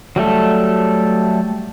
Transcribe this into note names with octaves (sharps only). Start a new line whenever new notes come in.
F#3 G3 A3 A4